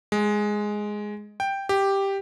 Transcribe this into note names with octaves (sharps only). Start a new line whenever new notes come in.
G#3
G5
G4